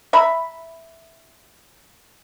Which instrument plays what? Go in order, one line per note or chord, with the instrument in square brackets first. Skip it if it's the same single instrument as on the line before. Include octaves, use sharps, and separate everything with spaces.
[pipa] E5 A#5 B5